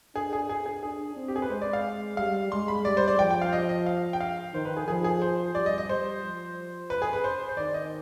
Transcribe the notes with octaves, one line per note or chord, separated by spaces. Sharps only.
D4 G#4
G#4
G#4
G#4
D4 G#4
C4
G4
G#4
B4
G#3 C5
D5
F5
G3 F5
G#3 C6
B5
G3 D5
C5
D5
F3 G5
G5
F5
D#5
D#5
F5
G5
F5
D#3 C5
B4
G#4
F3 G#4
G#4
C5
G3 D5
D#5
D#5
G3 C5
F3
B4
G#4
B4
C5
C5
D#3 D5
D#5